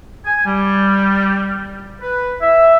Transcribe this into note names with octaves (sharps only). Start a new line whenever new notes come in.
G#5
G3
B4
E5